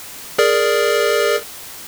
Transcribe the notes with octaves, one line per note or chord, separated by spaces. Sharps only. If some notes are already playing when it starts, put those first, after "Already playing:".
G#4 A#4 D5